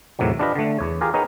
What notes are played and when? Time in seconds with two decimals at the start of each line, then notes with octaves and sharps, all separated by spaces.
0.19 E2 A2 C3 D#3 F#3
0.39 D4 F4 G4 B4 D#5
0.56 D3 A3
0.79 E2 C#5
1.01 F4 G4 G#4 A#4
1.14 B3 D#4 G#4 A#4 B4 C#5